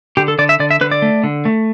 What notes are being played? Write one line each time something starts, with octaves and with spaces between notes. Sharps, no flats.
D3 G4
A4
D3 D5
E5
D3 D5
E5
D3 B4
D5
A3
D3
A3